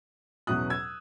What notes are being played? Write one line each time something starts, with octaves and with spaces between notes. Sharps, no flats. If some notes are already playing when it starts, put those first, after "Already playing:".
E2 B2 F#3 C#4 E4 D#6 F#6
E6 G#6